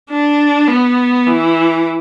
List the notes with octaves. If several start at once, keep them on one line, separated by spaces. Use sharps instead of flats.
D4
B3
E3